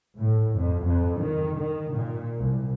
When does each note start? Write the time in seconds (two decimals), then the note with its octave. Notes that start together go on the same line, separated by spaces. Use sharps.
0.19 A2
0.57 F2
0.86 F2
1.20 D#3
1.59 D#3
1.94 A#2
2.40 C2